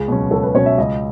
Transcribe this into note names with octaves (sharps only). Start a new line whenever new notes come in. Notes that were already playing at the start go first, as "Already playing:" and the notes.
Already playing: C#2 G#4
B2 F#3 C#4
C#2 A4
B4
B2 F#3 C#4 C#5
E5
C#2 D#5